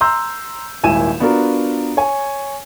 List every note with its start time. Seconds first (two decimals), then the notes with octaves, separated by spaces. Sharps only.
0.01 A#5 C6 E6 G6
0.83 D#1 G#1 E4 G#5 D#7 E7
1.20 B3 D4 F4 F#4 A#4
1.97 C#5 G#5